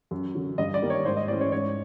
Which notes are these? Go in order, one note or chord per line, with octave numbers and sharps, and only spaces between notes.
F#2
D3 F#3
G2 D#5
D5
D#3 G3 A#3
C#5
G#2 C5
D#5
E3 A3 C#4 D5
C#5
G#2 C#5